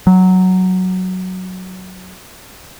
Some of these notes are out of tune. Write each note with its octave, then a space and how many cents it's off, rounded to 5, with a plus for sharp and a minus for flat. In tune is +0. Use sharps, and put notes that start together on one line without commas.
F#3 +0